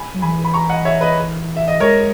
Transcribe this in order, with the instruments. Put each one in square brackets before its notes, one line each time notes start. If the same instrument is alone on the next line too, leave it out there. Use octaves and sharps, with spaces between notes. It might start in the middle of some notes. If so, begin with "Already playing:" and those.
Already playing: [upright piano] G#5 B5
[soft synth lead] F#3
[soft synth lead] E3 [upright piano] G#5 B5
[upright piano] B5
A#5 C#6
D#5 F#5
C#5 E5
B4 D#5
E5
D#5
[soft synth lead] G#3 [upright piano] A#4 C#5